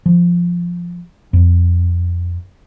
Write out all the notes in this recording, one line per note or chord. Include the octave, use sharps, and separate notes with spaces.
F3
F2